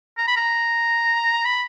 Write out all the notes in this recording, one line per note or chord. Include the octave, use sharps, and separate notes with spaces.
A#5
B5
A#5
B5